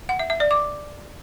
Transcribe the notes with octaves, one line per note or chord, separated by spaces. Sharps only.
F#5
E5
E5
D5
D6